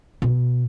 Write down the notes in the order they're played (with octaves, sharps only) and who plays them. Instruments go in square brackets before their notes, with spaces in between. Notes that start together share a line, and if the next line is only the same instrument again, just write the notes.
[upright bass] B2